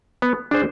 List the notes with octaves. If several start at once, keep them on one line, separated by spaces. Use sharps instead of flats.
B3
D4 G#4 C5